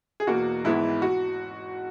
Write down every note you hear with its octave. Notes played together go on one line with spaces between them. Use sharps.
G#4
E2 B2 A#3 F#4
G#1 G#2 E3 G#3 B3 E4
F#4